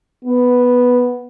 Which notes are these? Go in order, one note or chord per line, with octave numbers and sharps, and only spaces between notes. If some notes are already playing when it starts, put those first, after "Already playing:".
B3